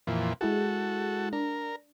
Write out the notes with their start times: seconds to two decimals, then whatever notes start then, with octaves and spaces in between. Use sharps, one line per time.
0.07 F2 A#2 E3
0.41 G#3 E4 F#4 G#4 A4
1.33 D4 A#4